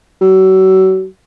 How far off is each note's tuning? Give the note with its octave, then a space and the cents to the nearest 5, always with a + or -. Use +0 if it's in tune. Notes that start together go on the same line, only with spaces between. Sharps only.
F#3 +35